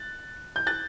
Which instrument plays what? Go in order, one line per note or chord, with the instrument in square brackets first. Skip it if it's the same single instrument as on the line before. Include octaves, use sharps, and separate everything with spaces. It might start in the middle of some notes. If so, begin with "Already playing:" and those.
Already playing: [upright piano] F#6 A6
G6
F#6 A6